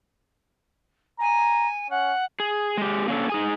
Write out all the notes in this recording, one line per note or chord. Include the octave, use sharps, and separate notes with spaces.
G#5 A#5
C#4 F#5
G#4
G#3 G4
A#3 C#4 D4 A4
D#4 G#4 G#5